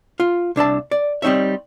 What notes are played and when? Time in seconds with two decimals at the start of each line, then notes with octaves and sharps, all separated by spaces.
0.20 F4
0.56 C2 D4 E5 A5
0.91 D5
1.22 G3 C4 D#4 C#5 E5